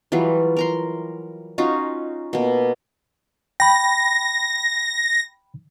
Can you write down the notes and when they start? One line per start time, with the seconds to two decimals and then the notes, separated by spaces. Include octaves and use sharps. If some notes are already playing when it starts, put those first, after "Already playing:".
0.12 E3 F#3 G3 F4
0.57 A#4 A#5 C6
1.58 C#4 D#4 F4 F#4
2.33 B2 A#3
3.60 G5 B5 A#6